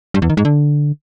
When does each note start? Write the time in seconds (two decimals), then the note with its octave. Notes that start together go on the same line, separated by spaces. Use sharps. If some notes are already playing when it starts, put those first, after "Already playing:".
0.14 G2
0.22 E2
0.30 D#3
0.37 G#2
0.45 D3